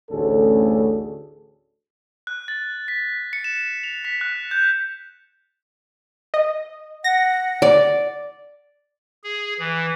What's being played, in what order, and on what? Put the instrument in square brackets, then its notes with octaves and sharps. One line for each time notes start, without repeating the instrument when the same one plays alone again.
[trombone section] A1 D2 A3 C#4 G#4 A4
[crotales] F#6
A6
B6
C#7
E7
F7
B6
F#6
G6
[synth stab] D#5
[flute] F#5 [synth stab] A#6
[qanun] D5
[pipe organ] G#4
E3